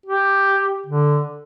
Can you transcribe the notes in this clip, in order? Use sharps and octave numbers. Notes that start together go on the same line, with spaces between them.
G4
D3